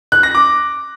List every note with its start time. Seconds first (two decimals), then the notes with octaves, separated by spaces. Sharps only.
0.12 F#6
0.23 A#6
0.35 D6